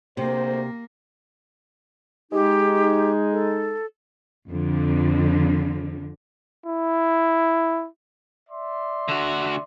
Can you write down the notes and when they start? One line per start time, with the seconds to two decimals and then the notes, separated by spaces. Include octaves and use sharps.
0.17 D2 C3 A#3 C5
2.32 G#3 D#4 G4
3.32 A4
4.50 F2 D3
6.66 E4
8.50 D5 E5 C6
9.08 D3 F#4